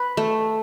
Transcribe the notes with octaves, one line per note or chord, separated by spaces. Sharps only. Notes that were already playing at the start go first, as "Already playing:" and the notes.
Already playing: B4
A3